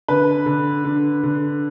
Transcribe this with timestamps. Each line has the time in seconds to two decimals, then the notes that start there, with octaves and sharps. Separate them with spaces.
0.08 D3 B4
0.46 D3
0.85 D3
1.23 D3